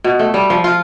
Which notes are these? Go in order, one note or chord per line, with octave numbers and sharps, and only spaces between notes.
B2
A3
G3
F3
F4